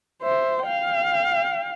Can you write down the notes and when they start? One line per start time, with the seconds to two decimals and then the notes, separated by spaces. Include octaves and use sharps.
0.23 C5 E5
0.64 F5 G5